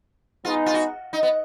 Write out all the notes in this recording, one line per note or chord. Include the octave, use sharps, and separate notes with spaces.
G#3 B3 D#4 F4 G#4
F4
F#4
D#4
B3